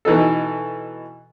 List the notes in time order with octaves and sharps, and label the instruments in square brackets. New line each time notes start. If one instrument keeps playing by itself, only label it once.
[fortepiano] B2 E3 D#4 A4